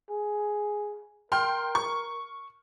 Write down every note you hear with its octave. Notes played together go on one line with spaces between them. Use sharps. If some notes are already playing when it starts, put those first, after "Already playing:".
G#4
A#4 G5 C6 F6
C#6